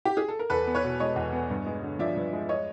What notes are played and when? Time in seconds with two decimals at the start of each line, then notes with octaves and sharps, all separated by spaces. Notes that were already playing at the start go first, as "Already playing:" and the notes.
0.05 G4
0.17 G#4
0.28 A4
0.39 A#4
0.50 E2 A4 B4
0.67 B3
0.75 B4 C#5
0.83 B2
1.00 G#3 C#5 D#5
1.16 E2
1.33 B3
1.50 G2
1.66 G#3
1.83 D3
1.99 F3 D5 E5
2.16 G2
2.33 G#3
2.49 C#5 D#5